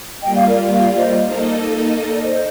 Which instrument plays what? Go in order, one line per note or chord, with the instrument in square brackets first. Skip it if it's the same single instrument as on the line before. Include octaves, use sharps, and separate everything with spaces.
[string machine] G3 A#3 F4 [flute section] D#5 G5
[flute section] D5 F5
A#4 D5
D5 F5
C5 D#5
[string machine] A#3 D#4 A4 D#5
[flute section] D5
C5 D#5